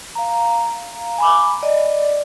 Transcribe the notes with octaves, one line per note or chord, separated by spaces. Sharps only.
F5 A#5
G#5 B5 D6
D5 D#5